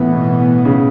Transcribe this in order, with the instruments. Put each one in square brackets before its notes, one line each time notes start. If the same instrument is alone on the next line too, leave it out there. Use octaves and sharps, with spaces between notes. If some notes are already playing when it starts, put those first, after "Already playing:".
Already playing: [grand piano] A2 [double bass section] E3 B3
[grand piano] B2
C#3